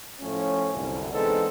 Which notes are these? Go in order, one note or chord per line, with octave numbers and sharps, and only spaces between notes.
A2 F3 A3 C#4
C2 F#2 D3
E3 G#3 B3 C4 D#4 A4